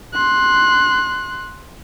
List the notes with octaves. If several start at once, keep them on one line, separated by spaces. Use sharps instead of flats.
C6 F#6